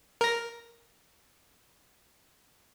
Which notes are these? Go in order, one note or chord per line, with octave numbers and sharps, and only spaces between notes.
A#4 A#6